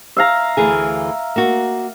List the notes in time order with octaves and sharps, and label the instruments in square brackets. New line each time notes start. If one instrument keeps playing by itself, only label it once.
[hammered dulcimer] E5 F5 A#5
[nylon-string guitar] D2 E3 G#4
A#3 F#4